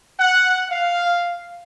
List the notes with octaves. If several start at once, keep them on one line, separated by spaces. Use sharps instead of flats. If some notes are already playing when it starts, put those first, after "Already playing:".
F#5
F5